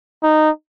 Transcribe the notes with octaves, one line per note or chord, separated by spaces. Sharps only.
D#4